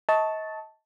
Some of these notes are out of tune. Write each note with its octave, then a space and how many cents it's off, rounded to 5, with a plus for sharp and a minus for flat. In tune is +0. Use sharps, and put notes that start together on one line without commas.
D#5 +35 A5 +0 C#6 +0